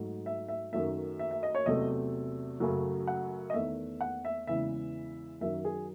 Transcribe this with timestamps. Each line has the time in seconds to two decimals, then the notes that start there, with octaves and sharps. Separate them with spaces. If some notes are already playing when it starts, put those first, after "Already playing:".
Already playing: G#2 F#3 A3
0.26 E5
0.48 E5
0.72 F#2 D#3 F#3 A3 E5
1.19 E5
1.31 E5
1.43 D#5
1.55 C#5
1.66 E2 C3 F#3 A3 D#5
2.60 F#2 C#3 F#3 A3
3.07 F#5
3.50 D#5
3.54 E2 D#3 A3 E5
4.01 F#5
4.25 E5
4.47 E2 C#3 E3 G#3 E5
5.41 F#2 D#3 F#3 E5
5.65 G#4